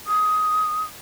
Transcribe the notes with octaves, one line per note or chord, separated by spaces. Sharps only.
D#6